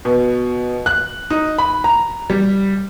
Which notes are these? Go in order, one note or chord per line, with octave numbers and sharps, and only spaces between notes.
B2
F#6
D#4
B5
A#5
G3